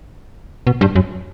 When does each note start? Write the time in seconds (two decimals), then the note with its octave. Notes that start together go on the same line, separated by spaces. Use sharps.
0.67 B2
0.81 G2
0.95 F#2